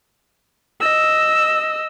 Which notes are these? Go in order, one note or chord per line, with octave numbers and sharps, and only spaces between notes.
D#5 E6